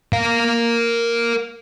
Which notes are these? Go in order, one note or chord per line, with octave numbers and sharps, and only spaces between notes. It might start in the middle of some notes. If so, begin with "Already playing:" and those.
A#4 F5